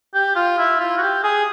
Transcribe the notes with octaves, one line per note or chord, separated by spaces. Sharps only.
G4
F4
E4
F4
F#4
G4
G#4